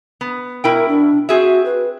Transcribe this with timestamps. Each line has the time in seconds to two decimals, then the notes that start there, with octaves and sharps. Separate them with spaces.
0.21 B3
0.64 B2 E4 A#4 G5
0.88 D4
1.29 C4 F#4 G#4 E5
1.65 B4